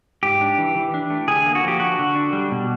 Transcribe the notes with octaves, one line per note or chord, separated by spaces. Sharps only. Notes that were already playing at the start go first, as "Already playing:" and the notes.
G#2 G4
D4
E3
E3
D4
A3
D3 G#4
A#3
F#4
F3 G4
D4 F#4
D3
D4
G3
B2